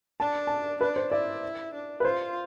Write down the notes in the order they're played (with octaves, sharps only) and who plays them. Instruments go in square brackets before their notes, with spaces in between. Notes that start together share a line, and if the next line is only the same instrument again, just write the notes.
[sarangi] D4 [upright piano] A5
[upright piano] A5
[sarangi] D4 [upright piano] B4
[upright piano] C5
[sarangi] E4 [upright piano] D5
[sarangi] D4
[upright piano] B4
[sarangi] F4 [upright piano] C5